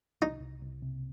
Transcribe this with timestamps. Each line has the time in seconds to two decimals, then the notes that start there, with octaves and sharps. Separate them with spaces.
0.21 C2 D#4
0.41 C2
0.61 C2
0.82 C3